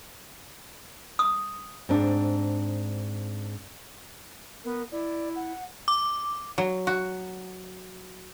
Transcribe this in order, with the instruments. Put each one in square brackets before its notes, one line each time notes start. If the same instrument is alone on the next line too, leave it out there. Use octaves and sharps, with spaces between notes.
[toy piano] D#6
[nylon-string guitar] G#2 C4 D4
[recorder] B3 [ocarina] A#4
[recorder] E4 [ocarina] D5
[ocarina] F#5
[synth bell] D6
[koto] F#3
F#4